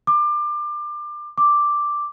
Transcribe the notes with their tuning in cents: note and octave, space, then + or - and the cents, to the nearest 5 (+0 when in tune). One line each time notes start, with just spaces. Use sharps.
D6 +25
D6 +0